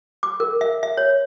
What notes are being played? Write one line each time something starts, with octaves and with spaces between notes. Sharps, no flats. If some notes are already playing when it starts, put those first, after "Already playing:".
D6
A#4
E5
E5
C#5